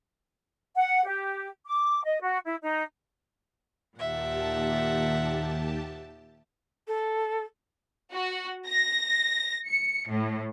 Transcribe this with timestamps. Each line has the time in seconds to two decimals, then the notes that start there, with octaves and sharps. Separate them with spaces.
0.76 F#5
1.05 G4
1.66 D6
2.05 D#5
2.22 F#4
2.45 E4
2.62 D#4
3.98 D#2 A#2 G4 E5 F#5 A5
6.87 A4
8.12 F#4
8.67 A#6
9.68 C#7
10.08 A2